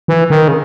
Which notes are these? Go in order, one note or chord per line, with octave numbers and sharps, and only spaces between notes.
E3
D#3
C#3